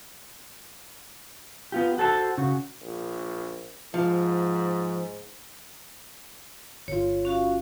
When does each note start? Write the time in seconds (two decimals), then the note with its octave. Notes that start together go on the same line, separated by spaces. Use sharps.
1.72 B3 F4 G4
1.98 F#4 A4 C5 A5
2.38 C#3 F#4
2.81 A#1
3.94 G#2 F3
6.88 G1 F4 C#5
7.25 C#4 F#4 F5